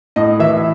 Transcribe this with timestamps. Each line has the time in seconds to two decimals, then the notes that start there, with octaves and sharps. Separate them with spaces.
0.16 A2 D#5
0.39 E3 E5